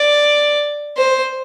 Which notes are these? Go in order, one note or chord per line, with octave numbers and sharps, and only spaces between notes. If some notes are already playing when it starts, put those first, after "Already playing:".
Already playing: D5
C5